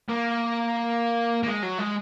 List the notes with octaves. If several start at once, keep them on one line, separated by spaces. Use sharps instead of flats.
A#3
A#3
G#3
F#3
G#3